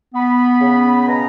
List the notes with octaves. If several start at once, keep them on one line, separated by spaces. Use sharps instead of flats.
B3 B5
C#3
B2 A#5